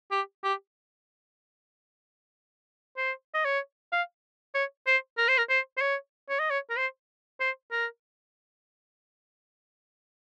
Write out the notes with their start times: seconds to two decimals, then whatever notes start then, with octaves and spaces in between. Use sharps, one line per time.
0.12 G4
0.44 G4
2.97 C5
3.34 D#5
3.45 C#5
3.92 F5
4.55 C#5
4.87 C5
5.18 A#4
5.28 C5
5.38 A#4
5.50 C5
5.77 C5
5.81 C#5
6.29 C#5
6.39 D#5
6.51 C#5
6.70 A#4
6.77 C5
7.40 C5
7.72 A#4